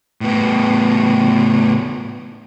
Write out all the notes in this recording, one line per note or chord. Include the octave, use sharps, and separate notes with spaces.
A2 B3